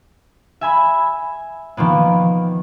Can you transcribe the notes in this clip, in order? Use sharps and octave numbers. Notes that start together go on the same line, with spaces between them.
E5 G#5 B5
D#3 F3 A#3 B3